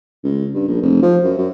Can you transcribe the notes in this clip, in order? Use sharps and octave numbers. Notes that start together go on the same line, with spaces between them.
C#2
G2
A#1
F1
F3
F#2
F#2